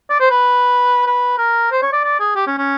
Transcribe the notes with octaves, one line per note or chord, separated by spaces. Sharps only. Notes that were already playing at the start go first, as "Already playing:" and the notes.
D5
C5
B4
B4
A#4
C5
C#5
D5
D5
G#4
G4
C#4
C#4